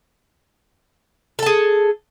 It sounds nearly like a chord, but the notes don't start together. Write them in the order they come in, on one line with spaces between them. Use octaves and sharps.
A4 A5 G#4